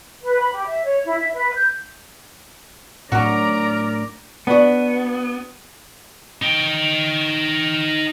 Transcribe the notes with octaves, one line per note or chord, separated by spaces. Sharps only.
B4
B5
G4
E5
C#5
E4
E5
B4
G6
A2 F#3 C#4 D4 F#4 A#4 D5 A#5
B3 D4 F#4
D#4 G5